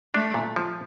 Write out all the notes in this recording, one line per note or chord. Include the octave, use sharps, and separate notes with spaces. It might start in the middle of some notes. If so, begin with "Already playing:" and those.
A3 D4
A#2
F3